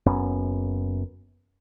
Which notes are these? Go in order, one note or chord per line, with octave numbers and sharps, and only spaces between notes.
F#1 F#2 B3 C#4